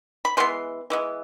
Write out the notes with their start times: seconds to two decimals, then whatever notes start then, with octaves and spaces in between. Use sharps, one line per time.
0.25 B5
0.37 C#3 E3 G#3 B3 C6
0.90 E3 G#3 B3